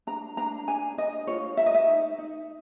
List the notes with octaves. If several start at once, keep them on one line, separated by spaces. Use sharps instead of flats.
D4 A#5
D4 A#5
D4 G#5
D4 D#5
F4 C#5
A#4 E5
D#5
E5
D#4
D#4